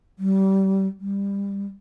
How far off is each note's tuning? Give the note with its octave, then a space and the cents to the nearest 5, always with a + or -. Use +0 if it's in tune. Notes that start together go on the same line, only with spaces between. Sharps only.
G3 -25
G3 +25